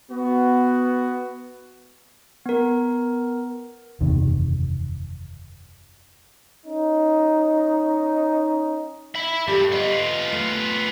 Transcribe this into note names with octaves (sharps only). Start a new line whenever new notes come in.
B3 F#4
B3 A#4
F#1 E2 C3 D#3
C#4 D#4
E5 B5
G2 G4 A4
B3 F4 D#5
A3